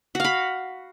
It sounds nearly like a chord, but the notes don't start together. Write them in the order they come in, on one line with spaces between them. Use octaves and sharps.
F#4 F5 B5